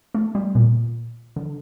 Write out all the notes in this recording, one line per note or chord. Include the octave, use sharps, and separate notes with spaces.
A3
G3
A#2
D3